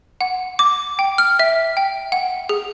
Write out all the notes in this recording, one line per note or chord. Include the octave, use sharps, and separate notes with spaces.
F#5
D6
G5
F6
E5
G5
F#5
G#4